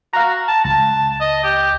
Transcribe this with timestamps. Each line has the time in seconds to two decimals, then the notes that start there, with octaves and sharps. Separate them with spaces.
0.13 F#4 F5 A#5
0.48 A5
0.65 C#2 A5
1.20 D#5
1.44 G4